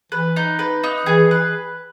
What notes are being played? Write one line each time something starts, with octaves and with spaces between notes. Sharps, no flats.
E3 B4
D#4
B4
D#4
E3 G#4
B4